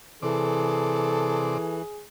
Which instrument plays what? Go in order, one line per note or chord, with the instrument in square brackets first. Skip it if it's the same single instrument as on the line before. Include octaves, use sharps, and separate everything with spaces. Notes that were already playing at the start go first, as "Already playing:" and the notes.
[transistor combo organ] C3 D5 [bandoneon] E3 [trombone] G#4 [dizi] A4